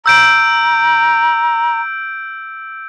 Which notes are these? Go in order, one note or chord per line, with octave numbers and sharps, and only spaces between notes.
A#5 E6 G6 D7